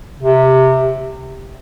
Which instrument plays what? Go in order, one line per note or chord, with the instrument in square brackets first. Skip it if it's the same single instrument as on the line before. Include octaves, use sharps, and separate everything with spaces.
[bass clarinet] C3